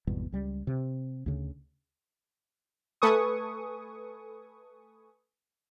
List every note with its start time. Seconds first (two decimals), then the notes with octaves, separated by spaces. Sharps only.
0.07 G#1 E2 B2 G3
0.32 C#2 G3
0.67 C3
1.26 D2 C#3
3.02 A3 A4 B4 G#5 C#6 D#6